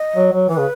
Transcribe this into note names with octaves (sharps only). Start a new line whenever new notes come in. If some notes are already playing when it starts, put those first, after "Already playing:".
Already playing: D#5
F#3
F#3
E3 B4
C#3